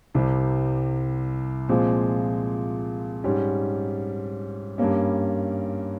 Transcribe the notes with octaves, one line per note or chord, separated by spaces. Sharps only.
C2 C3 G3 C4
A#2 F3 G#3 C4
G#2 G3 C#4 G4
G2 G3 A#3 C#4